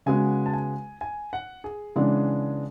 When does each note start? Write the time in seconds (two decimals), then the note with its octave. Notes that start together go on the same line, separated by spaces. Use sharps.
0.06 C#3 G#3 B3 F#4 G#5
0.46 A5
0.53 G#5
1.01 G#5
1.33 F#5
1.64 G#4
1.96 C#3 E3 G#3 B3 D4